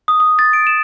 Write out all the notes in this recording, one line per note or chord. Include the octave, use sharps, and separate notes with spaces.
D#6
D#6
A6
D7
E7